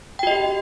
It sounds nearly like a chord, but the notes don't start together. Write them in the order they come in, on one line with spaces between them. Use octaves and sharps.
G5 F#4 D#5 G4